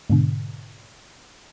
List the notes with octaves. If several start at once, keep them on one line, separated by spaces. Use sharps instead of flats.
G#2 B2 D3